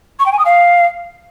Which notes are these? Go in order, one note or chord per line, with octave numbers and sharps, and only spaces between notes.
C#6
G5
G#5
D#6
F5